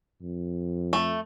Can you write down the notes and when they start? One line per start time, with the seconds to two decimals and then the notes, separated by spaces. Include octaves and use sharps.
0.22 F2
0.93 A3